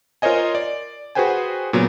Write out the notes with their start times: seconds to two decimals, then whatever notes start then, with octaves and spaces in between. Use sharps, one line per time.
0.22 F4 A#4 C5 C#5 D#5 G#5
0.55 D5
1.15 F#4 G#4 B4 C5 G5 G#5
1.73 A#2 C#3 F#3 B3